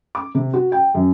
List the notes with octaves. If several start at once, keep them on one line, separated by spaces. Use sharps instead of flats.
D6
C3
F#4
G5
F#2